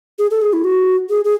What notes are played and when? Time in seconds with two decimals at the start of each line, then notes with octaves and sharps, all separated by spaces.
0.19 G#4
0.31 A4
0.42 G#4
0.53 E4
0.64 F#4
1.10 G#4
1.25 G#4